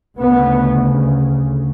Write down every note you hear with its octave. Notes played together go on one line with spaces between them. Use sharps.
D2 C#3 B3